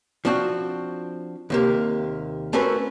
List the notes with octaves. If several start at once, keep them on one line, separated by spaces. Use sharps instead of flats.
F3 C4 D4 F#4
D#2 C3 A#3
A3 C4 C#4 F#4 A#4 B4